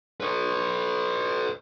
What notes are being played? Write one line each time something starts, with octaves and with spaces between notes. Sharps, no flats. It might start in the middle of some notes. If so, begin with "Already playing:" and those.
B4 C#5